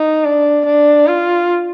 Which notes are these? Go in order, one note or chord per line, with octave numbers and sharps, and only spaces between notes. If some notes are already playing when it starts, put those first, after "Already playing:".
Already playing: D#4
D4
D4
F4